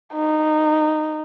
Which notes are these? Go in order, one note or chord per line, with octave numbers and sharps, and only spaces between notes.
D#4